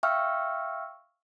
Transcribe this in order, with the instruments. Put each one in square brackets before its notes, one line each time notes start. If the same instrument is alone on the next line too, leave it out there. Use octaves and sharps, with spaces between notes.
[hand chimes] E5 F5 G5 C#6 E6 F6